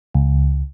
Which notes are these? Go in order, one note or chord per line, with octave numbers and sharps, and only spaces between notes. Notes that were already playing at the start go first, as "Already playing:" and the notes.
C#2